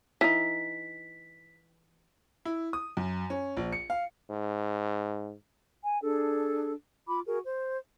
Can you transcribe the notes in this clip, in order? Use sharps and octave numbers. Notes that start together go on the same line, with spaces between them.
E3 D#4 B6
E4
D#6
F#2
C#4
A#1
C#7
F5
G#2
G#5
D4 G#4 A4
F4 B5 D6
F#4 G#4 A#4
C5